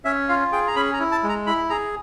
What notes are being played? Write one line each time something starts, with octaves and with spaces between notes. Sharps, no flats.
C#4 E5
F4 F5
G#4 G5
A#5
C#4 B5
A#5
E4
A5
G#3
A#5
E4 B5
G#4 A#5